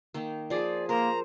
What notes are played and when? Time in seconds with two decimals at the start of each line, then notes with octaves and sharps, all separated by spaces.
0.14 D#3 A#3
0.50 F3 G#4 D5
0.89 A#3 A#4 C5 A#5